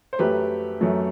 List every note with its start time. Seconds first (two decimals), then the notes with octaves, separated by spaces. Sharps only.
0.13 C5
0.19 F#2 F#3 A3 G4 B4
0.81 F#2 F#3 A3